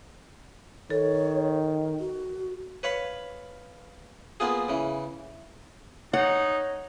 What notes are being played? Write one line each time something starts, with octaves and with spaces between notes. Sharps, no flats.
D#3 A4 C#5
F#4
B4 C#5 F5 B5
A#3 B3 F4 G#4
C#3 E3
D#4 C#5 F#5